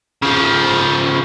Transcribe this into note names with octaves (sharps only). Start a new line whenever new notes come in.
C#3 F3